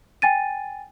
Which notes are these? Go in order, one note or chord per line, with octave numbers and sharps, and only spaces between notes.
G5 G#5 A6 D#7